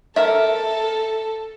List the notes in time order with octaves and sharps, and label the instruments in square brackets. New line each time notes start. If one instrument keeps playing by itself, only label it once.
[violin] A4 [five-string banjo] A#4 E5